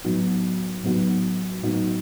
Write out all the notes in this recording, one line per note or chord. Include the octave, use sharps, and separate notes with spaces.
A2 F#3 B3 D#4 F#4
A2 F#3 B3 D#4 F#4
A2 F#3 B3 D#4 F#4